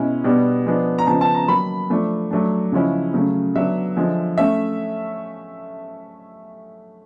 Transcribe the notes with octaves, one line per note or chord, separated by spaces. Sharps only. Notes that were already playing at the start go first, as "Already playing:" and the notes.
Already playing: B2 G#3 C#4 E4
B2 G3 B3 D4
F3 G#3 B3 D4
A#5
C#3 F3 G#3 B3 A5
A5
A#5
D#3 F#3 A#3 B5
F3 A3 D4
F#3 A3 D4
C#3 F3 G#3 C#4 E4
C#3 F#3 A3
D3 F#3 B3 D4 E5
D3 F3 G#3
A3 C#4 E5